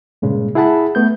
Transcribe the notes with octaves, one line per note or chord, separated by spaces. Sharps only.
G2 A#2 C#3 G#3
E4 G#4 F#5 A5 B5
A3 B3 G6